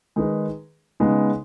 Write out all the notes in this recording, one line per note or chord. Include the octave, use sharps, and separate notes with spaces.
D#3 G#3 D#4 G#4 B4
C#3 G#3 B3 D#4